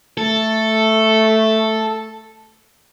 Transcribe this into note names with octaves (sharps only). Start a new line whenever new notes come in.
A3 A4